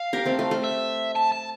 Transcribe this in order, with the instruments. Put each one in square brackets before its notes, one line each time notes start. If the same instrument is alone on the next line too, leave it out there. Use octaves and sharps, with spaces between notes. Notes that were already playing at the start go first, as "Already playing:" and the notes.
Already playing: [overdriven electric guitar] F5
[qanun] G4 A#4
A3 C4
A3
A3
[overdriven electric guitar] E5
A5
A5